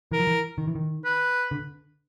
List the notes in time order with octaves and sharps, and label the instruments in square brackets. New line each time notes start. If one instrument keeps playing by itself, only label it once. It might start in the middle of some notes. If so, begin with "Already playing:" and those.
[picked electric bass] E3 [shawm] A#4
[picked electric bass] F3
E3
D#3
E3
D#3
[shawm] B4
[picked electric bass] D3